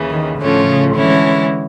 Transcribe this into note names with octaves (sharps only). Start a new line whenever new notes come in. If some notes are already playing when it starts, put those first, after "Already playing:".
Already playing: D#2 C#3 E3
D#3
A2 D3 F3 A3 C#4 F4
C#3
D3 E3 G#3 C#4 E4